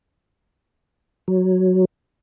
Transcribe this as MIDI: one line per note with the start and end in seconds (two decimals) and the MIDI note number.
1.28 1.85 54